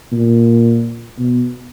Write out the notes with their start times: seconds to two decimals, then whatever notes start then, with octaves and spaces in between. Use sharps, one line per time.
0.12 A#2
1.18 B2